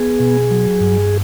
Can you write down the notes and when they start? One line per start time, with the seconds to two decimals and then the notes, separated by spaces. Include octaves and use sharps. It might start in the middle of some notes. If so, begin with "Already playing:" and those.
Already playing: B3 G#4
0.20 B2
0.51 F#3
0.81 G2